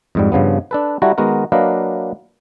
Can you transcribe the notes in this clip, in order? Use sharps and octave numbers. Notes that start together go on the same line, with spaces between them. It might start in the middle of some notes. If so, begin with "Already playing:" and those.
F2 G#2 G3
G2 C#3 F3 B3
D4 A4 B4
G3 E4 F#4 A4 A#5
D#3 G#3 B3 F#4 A#4
F#3 A#3 D4 B4 D#5 F5